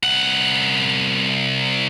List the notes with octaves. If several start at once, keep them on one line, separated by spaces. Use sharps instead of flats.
C2 F#5